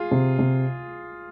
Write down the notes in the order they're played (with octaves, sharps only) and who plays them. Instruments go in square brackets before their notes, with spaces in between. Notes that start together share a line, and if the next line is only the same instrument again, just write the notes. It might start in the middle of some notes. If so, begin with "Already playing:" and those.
Already playing: [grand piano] F4 G#4
[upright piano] C3
C3